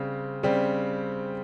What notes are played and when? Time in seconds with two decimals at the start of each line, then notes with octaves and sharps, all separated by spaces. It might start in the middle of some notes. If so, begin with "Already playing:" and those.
Already playing: C#3 G3 C4
0.43 C#3 G3 C4